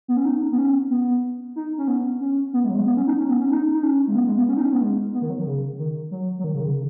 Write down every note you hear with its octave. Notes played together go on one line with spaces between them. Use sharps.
B3
C#4
D#4
B3
C#4
B3
D#4
C#4
B3
C#4
B3
G#3
F#3
G#3
B3
C#4
D#4
C#4
B3
C#4
D#4
D#4
C#4
G#3
B3
G#3
B3
C#4
D#4
C#4
B3
G#3
B3
D#3
F#3
D#3
C#3
D#3
F#3
F#3
D#3
C#3
D#3
C#3